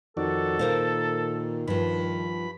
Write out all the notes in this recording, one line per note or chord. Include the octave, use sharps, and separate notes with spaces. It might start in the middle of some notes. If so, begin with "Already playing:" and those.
F2 D#3 F#4 A4 D5
A#2 A#4 C5 F5
G2 F3 B5